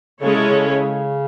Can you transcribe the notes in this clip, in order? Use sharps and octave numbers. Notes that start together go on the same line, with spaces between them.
C#3 G#3 C#4 E4 A4 C#5
C3
C#3